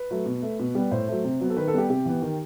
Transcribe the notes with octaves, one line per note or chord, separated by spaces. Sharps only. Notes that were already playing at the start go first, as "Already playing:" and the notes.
Already playing: B4
F#3 A3
B2
A3
B2
G3 B3
A2 C5
F#3 A3
C3
F#3 B3
A4
D#3 B4
A4
G3 B3 G4
C3 G4
E3 B3
D#3